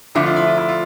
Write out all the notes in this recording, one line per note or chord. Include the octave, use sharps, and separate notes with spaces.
F2 D3 F3 A3 E4
F4
E4
F4
E4
F4